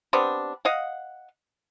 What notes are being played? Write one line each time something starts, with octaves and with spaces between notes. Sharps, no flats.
G3 B3 C4 D4
D#5 F5 F#5